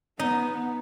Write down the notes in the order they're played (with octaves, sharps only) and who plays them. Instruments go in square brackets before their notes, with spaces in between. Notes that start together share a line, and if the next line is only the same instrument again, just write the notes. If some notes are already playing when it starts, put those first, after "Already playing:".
[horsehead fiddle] B3 [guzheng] D#4